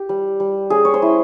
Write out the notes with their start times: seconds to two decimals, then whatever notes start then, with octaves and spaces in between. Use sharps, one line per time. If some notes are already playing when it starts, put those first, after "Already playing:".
Already playing: G4
0.09 G3
0.40 G3
0.70 C#4 G#4
0.85 C#5
0.94 C5
1.02 E4